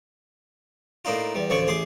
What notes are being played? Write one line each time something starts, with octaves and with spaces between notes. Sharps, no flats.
A2 A#3 D4 D#4 F4
E2 G3
A1 D2 F3 D5 C#6
A1 G#4 C6 D6